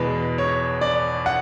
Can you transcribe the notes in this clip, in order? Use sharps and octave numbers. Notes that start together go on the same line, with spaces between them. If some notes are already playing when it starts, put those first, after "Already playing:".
Already playing: E2 B2 G#3 B4
C#5
D5
F#5